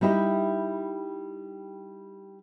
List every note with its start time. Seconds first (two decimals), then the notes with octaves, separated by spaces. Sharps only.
0.01 G3 D#4 E4 G4